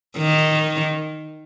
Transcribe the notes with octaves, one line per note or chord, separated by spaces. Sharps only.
D#3